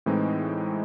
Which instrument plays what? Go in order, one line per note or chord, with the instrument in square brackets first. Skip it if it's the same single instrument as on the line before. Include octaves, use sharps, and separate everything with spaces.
[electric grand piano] A2 E3 G#3 C4 D#4